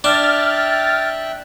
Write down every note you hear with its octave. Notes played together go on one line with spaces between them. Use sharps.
D4 E5 G5 F6 F#6 A6